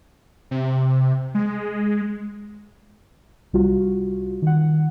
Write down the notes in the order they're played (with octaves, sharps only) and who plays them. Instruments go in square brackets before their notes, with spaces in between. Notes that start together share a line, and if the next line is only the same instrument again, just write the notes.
[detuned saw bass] C3
G#3
[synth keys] C2 G3 F4 F#4
D#3 F#5